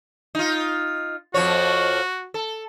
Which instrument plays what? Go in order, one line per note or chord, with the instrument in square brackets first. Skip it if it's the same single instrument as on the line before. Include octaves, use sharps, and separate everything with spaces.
[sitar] D#4 F4
[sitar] F2 F3 C#5 [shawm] F#4
[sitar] A4